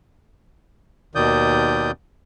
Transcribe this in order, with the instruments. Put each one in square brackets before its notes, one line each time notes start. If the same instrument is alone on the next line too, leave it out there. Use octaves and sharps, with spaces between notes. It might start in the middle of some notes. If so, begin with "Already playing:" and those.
[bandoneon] D#2 B2 D#3 D5 D#6 G6